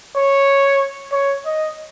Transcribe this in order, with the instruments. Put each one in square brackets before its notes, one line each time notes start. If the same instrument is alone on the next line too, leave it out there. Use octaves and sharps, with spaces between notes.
[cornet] C#5
C#5
D#5